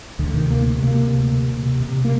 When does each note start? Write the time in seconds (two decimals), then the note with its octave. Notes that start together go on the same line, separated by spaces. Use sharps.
0.19 D2 D3
0.34 C3 D#3
0.50 D2 A#3
0.66 C3
0.82 C3 A#3
0.99 C3
1.15 D2
1.31 C3
1.48 C3
1.63 C3
1.80 C3
1.96 C3
2.05 A#3